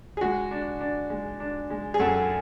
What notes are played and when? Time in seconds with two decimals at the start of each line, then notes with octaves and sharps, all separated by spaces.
0.17 G#4
0.21 G#3 F#4
0.51 D4
0.80 D4
1.10 G#3
1.40 D4
1.70 G#3
1.94 G#4
2.00 F#2 A4